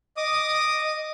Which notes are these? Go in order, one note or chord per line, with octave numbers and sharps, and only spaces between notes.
D#5 D6 D#6